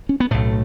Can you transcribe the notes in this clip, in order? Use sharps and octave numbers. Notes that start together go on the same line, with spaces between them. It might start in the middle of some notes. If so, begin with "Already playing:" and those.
C#4
B3
B1 A2 A3